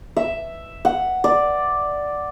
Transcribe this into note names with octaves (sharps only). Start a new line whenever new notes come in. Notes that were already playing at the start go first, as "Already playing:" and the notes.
E5
F#5
D5